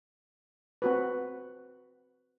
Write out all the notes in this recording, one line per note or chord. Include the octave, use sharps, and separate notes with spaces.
C4 F#4 B4